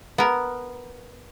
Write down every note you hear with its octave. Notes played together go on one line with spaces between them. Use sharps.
B3 A#4